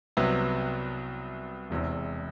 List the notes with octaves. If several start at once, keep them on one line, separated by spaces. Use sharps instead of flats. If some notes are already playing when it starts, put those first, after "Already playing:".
C2 C3 F#3 B3
E1 E2 C3